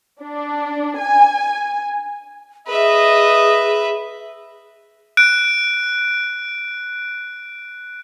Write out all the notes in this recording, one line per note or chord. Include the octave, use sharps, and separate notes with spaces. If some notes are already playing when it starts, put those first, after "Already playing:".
D4
G#5
G#4 B4 D#5 E5
F#6 D7